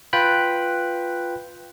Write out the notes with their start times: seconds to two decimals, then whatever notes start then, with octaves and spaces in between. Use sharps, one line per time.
0.13 F4 B4 G5 B5 F#6